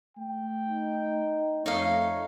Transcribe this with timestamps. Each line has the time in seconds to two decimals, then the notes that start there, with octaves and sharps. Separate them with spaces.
0.17 A3 G5
0.68 D#4
1.66 F2 A3 D#4 C#5 D#5 F5